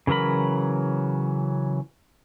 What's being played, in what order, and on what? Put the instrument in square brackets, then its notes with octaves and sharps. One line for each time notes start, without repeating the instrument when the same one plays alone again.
[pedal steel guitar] C#3 E3 F#3 A#4 B5